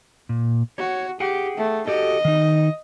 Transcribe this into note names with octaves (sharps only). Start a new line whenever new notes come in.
A#2
F#4 C#5
G4 G#4 F#5 G5
A3
F#4 G4 A4 D#5
D#3 D#4